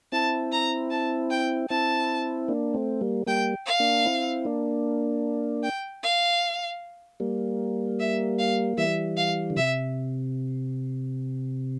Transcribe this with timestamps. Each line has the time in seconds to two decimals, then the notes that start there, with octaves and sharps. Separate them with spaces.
0.12 C4 E4 A5
0.52 A#5
0.90 A5
1.30 G5
1.70 C4 E4 A5
2.48 A#3 D4
2.74 A3 C4
3.01 G3 A#3
3.27 G3 A#3 G5
3.66 F5
3.80 A#3 D4
4.05 C4 E4
4.45 A#3 D4
5.63 G5
6.03 F5
7.20 G3 A#3
8.00 E5
8.39 F5
8.77 E3 G3 E5
9.17 F5
9.50 D3
9.56 C3 E5